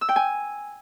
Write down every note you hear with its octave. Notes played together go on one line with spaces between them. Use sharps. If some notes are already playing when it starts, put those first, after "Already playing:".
E6
G5
G#5